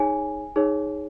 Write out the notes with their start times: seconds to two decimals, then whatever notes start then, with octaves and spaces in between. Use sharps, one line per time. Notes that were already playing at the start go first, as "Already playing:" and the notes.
Already playing: D#4 G#4 C#5 G#5
0.56 D#4 G#4 C#5